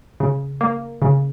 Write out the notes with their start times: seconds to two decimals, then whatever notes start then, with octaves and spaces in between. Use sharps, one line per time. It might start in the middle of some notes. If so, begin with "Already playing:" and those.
0.20 C#3
0.61 A#3
1.02 C#3